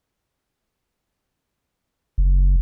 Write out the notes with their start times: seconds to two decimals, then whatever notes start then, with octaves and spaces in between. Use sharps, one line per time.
2.18 F#1